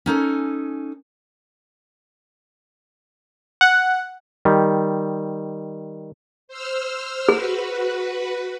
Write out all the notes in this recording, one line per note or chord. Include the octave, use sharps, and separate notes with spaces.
C#4 D#4 A4 G#5
F#5
D#3 G3
C5 E6 F6
F#4 G#4 B4